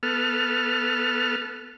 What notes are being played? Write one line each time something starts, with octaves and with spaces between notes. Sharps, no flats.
B3 A4 F6